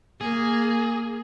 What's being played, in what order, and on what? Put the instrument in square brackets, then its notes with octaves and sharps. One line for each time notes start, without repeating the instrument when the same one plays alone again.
[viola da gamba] A#3 [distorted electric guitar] G#4